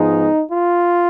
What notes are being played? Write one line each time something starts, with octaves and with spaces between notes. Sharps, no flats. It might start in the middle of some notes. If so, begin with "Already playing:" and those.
Already playing: G#2 F3 G#3 B3 D#4
F4